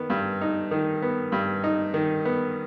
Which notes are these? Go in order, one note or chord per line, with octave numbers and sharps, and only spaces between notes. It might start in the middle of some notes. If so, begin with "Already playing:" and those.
Already playing: D#3 B3
G2
D#4
D#3
B3
G2
D#4
D#3
B3